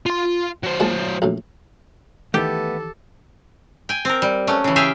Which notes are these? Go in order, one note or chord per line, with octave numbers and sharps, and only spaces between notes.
F4 C6
F#3 C5
A#2 G#3 A5
A#1 F#2 A2
D#3 E3 A3 B3 G4 A4
G5 G#5
C4 A#4
G3
F#3 A3 C#4
C#3 E3
G4 G#4 E5 F5 G5 G#5